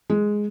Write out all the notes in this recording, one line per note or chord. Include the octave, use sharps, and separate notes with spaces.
G#3